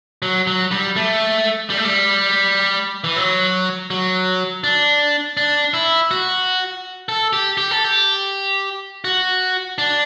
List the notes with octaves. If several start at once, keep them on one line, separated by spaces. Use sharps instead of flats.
F#3
F#3
G3
A3
G3
A3
G3
E3
F#3
F#3
D4
D4
E4
F#4
A4
G4
G4
A4
G4
F#4
D4